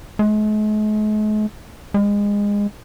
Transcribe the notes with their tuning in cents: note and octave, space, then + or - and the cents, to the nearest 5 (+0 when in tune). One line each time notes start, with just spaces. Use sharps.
G#3 +45
G#3 -25